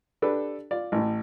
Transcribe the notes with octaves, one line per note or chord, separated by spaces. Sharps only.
D4 G4 A4 B4
F4 D5
A1 A2